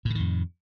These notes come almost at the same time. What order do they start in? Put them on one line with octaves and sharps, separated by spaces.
A2 D3 D#3 F2